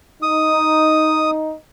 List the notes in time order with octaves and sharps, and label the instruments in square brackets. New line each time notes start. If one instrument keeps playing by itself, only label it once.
[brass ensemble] D#4 [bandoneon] D#6